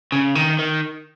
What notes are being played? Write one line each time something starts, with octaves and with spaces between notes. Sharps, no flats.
C#3
D#3
D#3